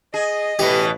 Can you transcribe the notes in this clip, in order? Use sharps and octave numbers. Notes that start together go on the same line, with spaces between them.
G#4 D#5
A1 B2 E3 G4 B4